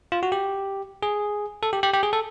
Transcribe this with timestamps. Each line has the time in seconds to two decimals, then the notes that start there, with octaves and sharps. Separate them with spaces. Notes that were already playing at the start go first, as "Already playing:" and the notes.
0.12 F4
0.23 F#4
0.32 G4
1.03 G#4
1.63 A4
1.73 G4
1.83 G4
1.93 G4
2.03 G#4
2.13 A4